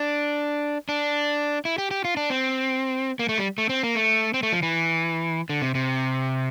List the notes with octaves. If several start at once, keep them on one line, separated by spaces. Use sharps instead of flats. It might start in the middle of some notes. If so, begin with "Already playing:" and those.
Already playing: D4
D4
E4
G4
G4
F4
D4
C4
A#3
A3
G3
A3
C4
A#3
A3
C4
A3
F3
E3
D3
C3
C3